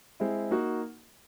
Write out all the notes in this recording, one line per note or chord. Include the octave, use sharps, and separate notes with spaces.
G#3 C4 E4
A#3 D#4 F#4